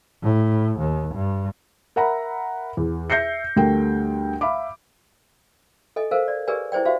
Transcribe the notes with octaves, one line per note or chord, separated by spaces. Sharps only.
A2
D#2
G2
A#4 E5 F#5 A#5 B5
E2
E5 G6 A#6 C7 C#7
D2 G3 A3 A#4 G5
E5 F5 B5 D6
A4 D#5 G#5
A4 A#4 C5 F5
D5
G4 G#4 A#4 B4 D5 G#5
E4 G#4 C5 D5 G5
F#4 G4 C5 E5 F5